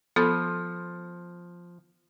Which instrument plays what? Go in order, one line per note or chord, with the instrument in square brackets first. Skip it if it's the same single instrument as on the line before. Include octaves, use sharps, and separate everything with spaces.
[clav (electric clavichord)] F3 [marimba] B3 A4